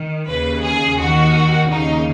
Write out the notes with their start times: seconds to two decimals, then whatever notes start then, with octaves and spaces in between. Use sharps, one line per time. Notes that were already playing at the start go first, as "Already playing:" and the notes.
Already playing: D#3
0.28 D#2 C#3 B4
0.63 G#4
0.98 D#2 D#3 F#4
1.68 D#2 C#3 D#4